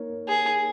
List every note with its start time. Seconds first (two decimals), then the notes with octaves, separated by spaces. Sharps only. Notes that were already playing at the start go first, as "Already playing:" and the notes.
Already playing: A#3 D#4 A#4 C#5
0.28 G#4